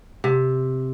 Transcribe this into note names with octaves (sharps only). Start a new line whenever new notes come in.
C3